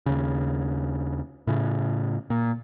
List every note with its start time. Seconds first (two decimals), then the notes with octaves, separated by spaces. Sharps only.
0.06 D#2 C#3
1.47 A2 C#3
2.30 A#2